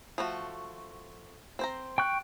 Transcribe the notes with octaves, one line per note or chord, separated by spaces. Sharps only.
F3 A3 F#4
C4 C5 A#5
G5 C#6 F#6